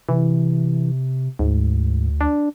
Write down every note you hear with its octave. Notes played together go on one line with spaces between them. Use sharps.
C3 E3
D2 G#2
D4